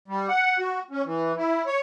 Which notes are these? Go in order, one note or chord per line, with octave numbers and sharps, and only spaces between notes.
G3
F#5
F#4
C#4
E3
E4
C#5